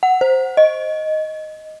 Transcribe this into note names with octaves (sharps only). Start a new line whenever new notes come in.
F#5
C5
D#5